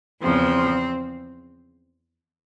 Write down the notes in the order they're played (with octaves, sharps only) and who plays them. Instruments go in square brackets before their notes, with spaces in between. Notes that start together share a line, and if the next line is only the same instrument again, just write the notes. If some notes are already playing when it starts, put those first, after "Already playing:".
[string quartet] E2 C#3 F3 C4